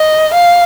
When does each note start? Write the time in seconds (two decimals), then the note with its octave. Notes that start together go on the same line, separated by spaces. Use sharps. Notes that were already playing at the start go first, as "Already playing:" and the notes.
Already playing: D#5
0.34 F5